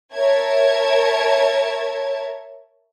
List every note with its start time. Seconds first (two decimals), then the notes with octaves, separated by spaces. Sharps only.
0.13 A#4 C#5 E5 A5 G#6